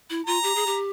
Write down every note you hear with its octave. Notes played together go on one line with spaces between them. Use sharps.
E4
F4 A#5
G4
G#4
G4